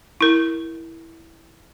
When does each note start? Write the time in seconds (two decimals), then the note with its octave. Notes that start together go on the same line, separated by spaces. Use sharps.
0.21 E4 A#4